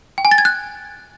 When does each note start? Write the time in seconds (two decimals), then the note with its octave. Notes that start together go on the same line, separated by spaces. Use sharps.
0.18 G5
0.25 G#5
0.31 A6
0.38 G#6
0.45 F#6